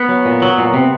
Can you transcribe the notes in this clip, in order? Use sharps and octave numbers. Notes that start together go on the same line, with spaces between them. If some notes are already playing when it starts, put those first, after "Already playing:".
Already playing: B3
F#3
A#2
F#3
A#2
C3